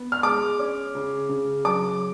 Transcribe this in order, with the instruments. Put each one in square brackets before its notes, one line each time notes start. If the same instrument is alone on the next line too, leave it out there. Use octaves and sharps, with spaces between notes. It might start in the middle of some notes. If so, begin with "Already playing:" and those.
Already playing: [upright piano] B3
F6
G#3 D6
C#4
C#3
C#3
F#3 D6